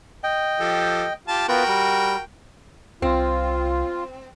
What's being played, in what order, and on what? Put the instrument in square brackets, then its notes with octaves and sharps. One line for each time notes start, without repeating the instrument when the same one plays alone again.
[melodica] D#5 G5
[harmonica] F3 G4 A4
F4 G4 A5
[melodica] B3 F4 B4 [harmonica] F#4 A#4 G5
[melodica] G3
[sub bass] C2 [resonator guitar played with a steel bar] C4 [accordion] F4